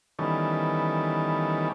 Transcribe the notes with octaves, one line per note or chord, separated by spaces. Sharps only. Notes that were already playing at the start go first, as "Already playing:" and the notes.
D#3 E3 G3 B3 C#4 A4